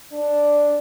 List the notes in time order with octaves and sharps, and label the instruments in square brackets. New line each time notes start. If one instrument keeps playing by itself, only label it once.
[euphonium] D4